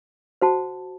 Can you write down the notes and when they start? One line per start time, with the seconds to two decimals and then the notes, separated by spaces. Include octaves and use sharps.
0.42 F#4 C5 F#5 A5